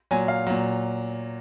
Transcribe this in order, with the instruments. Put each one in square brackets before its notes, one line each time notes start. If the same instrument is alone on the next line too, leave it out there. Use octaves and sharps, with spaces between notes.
[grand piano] A#2 F#3 G#5
F5
A#2 F#3